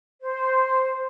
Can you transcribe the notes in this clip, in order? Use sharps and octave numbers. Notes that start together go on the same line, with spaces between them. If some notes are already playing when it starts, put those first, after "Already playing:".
C5